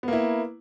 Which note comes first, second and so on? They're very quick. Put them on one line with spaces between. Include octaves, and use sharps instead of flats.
B3 A#3 E4